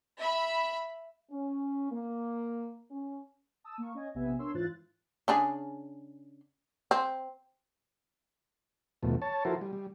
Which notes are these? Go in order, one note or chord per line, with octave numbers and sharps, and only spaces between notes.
E5 B5
C#4
A#3
C#4
A5 D#6 E6
A#3 C#6
C#4 D#5 G#5
A#1 C3 B3 E5 G#5
D4 A#4 C#5 C6 E6
G#2 E3 F4 C5 F#6 A6
C#3 D4 G#4
C4
D#2 B2 F3 A3
C#5 A5
F3 E4 F#4 A4 A#4 C5
G3
G3